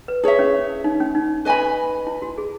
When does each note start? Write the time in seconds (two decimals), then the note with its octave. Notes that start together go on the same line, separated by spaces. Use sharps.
0.08 B4
0.24 E4 G#4 C#5 E5
0.39 C#4
0.84 D#4
1.00 C#4
1.15 D#4
1.45 B4 D#5 G#5 B5
2.07 E4
2.22 F#4
2.38 G#4